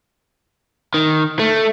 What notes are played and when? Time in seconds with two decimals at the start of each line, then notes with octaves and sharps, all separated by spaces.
0.94 D#3
1.39 A3